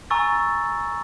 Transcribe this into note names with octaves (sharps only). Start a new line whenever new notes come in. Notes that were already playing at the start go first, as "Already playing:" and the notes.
G#5 A#5 C#6 E6 A6